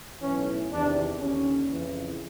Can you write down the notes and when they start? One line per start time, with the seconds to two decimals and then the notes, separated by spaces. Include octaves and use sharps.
0.21 B1 A2 E3 C#4
0.70 E2 C3 D#3 D4
1.19 D#2 D3 C#4
1.69 F2 C#3 E3